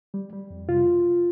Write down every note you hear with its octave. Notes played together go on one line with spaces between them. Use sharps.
G3
G3
F2
C3 F4